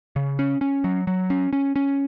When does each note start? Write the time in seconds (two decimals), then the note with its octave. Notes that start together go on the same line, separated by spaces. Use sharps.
0.16 C#3
0.39 C#4
0.61 C#4
0.84 F#3
1.07 F#3
1.30 C#4
1.53 C#4
1.76 C#4